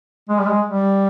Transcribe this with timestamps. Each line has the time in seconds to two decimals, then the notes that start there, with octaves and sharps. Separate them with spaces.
0.30 G#3
0.40 G3
0.47 G#3
0.66 G3